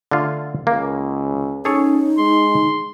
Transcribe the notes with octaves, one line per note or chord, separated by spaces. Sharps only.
D3 A3 F4
C#2 A#3
C#4 D#4 G#4 A4 C#5
G#3 C6